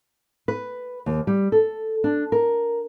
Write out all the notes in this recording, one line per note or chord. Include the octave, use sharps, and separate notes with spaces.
B4
D#2
G3
A4
D4
A#4